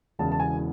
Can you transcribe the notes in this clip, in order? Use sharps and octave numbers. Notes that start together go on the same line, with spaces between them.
E1 E2 C#3 E3 A5
A5
G#5